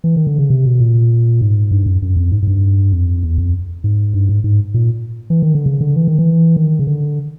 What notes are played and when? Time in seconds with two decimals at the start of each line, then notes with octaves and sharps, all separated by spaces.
0.04 E3
0.16 D#3
0.27 D3
0.38 C#3
0.50 C3
0.65 B2
0.80 A#2
1.41 G#2
1.71 G2
1.86 F#2
2.02 F#2
2.16 F2
2.31 G#2
2.42 G#2
2.47 G2
2.92 F2
3.23 E2
3.38 F2
3.84 G#2
4.14 G2
4.29 G#2
4.44 G#2
4.74 A#2
5.30 E3
5.42 D#3
5.55 D3
5.66 C#3
5.81 D3
5.96 E3
6.07 D#3
6.19 E3
6.56 D#3
6.79 C#3
6.87 D3